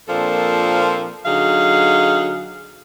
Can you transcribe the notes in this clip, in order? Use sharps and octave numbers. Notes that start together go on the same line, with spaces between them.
A#2 F3 A#3 C4 D4 A4
D3 F#3 D#4 G#4 F5